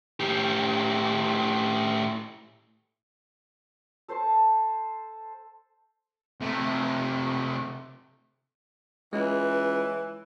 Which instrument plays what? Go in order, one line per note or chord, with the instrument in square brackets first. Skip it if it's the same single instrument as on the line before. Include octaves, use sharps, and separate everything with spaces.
[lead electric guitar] A2 G4
[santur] A4 C5 A5 C6
[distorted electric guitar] C3 A3
[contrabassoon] C#2 [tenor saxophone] E3 [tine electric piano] G#3